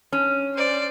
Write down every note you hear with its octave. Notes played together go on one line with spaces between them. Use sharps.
C#4
C5 D5